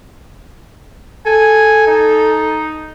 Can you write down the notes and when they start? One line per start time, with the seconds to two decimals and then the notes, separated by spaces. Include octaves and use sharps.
1.26 A4 G#5
1.87 D#4